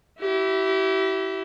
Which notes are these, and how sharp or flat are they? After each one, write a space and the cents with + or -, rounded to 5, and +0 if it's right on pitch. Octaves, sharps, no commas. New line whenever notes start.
E4 +0 G4 -35